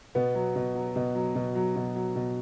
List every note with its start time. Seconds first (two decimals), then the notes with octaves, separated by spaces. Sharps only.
0.15 B2 B3
0.35 F#3
0.56 B2
0.75 F#3
0.96 B2
1.15 F#3
1.35 B2
1.55 F#3
1.76 B2
1.95 F#3
2.16 B2